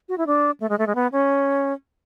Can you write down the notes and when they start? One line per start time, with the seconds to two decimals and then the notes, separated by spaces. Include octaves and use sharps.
0.09 F#4
0.18 E4
0.27 D4
0.60 A3
0.69 G#3
0.79 A3
0.87 G#3
0.95 B3
1.12 C#4